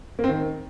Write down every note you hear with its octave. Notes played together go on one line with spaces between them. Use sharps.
A#3
C4
D#3